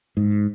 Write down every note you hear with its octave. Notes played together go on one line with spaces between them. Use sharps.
G#2